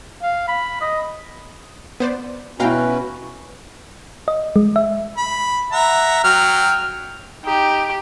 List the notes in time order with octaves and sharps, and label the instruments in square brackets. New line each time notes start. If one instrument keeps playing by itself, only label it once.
[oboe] F5
B5
D#5
[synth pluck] B3 C5 D5
[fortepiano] B2 E4 [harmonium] C#4 F#4 B4 [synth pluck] F5 G5 A#5
[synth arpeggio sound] D#5
G#3
E5
[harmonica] B5
E5 F#5 A#5
F#3 G5 F6
[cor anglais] D#4 [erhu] G4